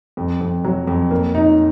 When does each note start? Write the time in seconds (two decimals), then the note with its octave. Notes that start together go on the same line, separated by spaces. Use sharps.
0.17 F2
0.41 F2
0.64 F#3
0.87 F2
1.11 A#3
1.35 D#4